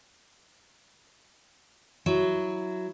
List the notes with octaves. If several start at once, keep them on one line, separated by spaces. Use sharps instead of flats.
F#3 E4